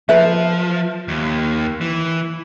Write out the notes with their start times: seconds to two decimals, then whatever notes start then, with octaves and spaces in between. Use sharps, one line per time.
0.09 F3 B4 E5
1.08 D#2
1.81 E3